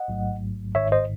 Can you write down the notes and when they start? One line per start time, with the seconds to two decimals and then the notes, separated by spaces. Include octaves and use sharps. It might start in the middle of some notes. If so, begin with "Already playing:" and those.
Already playing: D#5 F#5
0.08 A1 G#2 F#3 A3
0.74 G#1 G#2 D#3 C#5 E5
0.92 C5 D#5